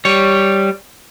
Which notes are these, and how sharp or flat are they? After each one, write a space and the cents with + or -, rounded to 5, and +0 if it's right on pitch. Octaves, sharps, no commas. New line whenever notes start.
G3 +0 C#5 +0